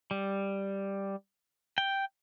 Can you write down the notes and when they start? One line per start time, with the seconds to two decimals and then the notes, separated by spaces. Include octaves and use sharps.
0.11 G3
1.78 G5